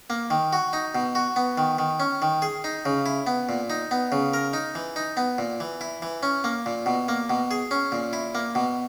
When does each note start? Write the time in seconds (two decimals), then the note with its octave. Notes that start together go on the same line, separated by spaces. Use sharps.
0.10 A#3
0.30 D#3
0.53 F#4
0.73 D#4
0.95 B2
1.15 F#4
1.36 B3
1.58 D#3
1.79 D#3
2.00 C#4
2.22 D#3
2.42 G#4
2.64 D#4
2.85 C#3
3.06 E4
3.27 B3
3.49 A#2
3.70 D#4
3.91 B3
4.12 C#3
4.33 A#4
4.53 D#4
4.75 E3
4.96 D#4
5.17 B3
5.38 A#2
5.60 E3
5.81 E4
6.02 E3
6.23 C#4
6.44 A#3
6.66 A#2
6.86 B2
7.08 A#3
7.30 B2
7.51 G#4
7.71 C#4
7.92 A#2
8.13 E4
8.35 A#3
8.55 B2